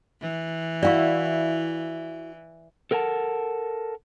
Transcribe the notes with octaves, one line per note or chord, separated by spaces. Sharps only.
E3
E4 F#4 D5 F5 C#6
A4 A#4 F#5 G5 A5